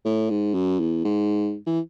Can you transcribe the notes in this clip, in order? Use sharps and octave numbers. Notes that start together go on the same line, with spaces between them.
A2
G#2
F#2
E2
G#2
E3